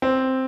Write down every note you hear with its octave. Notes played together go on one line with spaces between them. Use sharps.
C4